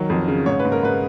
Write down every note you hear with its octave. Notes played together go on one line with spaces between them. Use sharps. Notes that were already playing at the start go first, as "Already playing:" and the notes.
Already playing: D#3 F#3
F2
C#3
G#2 C#5
B4
G#2
A#4
G#2 B4